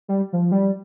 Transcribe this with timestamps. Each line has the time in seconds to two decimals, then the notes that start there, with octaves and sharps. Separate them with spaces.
0.08 G3
0.33 F3
0.52 G3